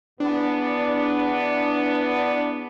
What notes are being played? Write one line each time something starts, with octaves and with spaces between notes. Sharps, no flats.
E2 B3 D4